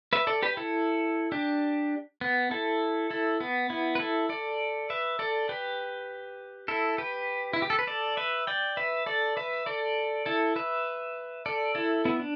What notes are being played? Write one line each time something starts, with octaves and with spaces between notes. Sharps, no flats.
B4 E5
A4 D5
G4 B4
E4 A4
D4 G4
B3
E4 A4
E4 A4
B3
B3 E4
B4
E4 A4
A4 D5
B4 E5
A4 D5
G4 B4
E4 A4
G4 B4
E4
G4
A4
B4
A4 D5
B4 E5
D5 G5
B4 E5
A4 D5
B4 E5
A4 D5
E4 A4
B4 E5
A4 D5
E4 A4
B3 E4
D4